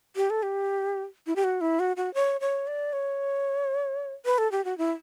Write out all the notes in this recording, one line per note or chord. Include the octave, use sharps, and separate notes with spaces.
G4
A4
G4
E4
G4
F#4
E4
F#4
F#4
C#5
C#5
D5
C#5
B4
A4
G4
F#4
E4